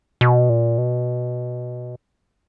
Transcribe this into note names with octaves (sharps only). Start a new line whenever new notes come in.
B2
A#2
B2